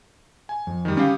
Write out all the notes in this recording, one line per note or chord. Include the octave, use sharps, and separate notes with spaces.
G#5
F2
D#3 G3
G3 C#4 G4 F5